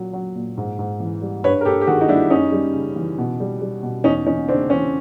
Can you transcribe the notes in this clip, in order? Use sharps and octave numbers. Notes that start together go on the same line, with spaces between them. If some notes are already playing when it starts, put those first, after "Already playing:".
Already playing: A#2 F#3
F#3
A#2
G#2
G#2
E3
G3
G2 B4 C#5
A#4
G2 G4 A4
G4
D#3 F#4 G#4
D#4
G3 D4 E4
F#2 C#4 D#4
G3
C#3
E3
B2
G3
G3
B2
E2 C#4 D#4
E2 C#4 D#4
C#3 C4 D4
E3 C#4